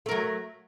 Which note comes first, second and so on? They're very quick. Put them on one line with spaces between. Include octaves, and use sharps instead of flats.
A3 A#4 F#3